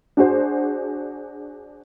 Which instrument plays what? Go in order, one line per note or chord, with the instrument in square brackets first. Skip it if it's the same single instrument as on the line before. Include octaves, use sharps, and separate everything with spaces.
[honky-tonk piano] D4 F#4 G#4 C5